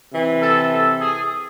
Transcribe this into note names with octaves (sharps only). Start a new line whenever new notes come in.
C3 E3
A4
A4
G#4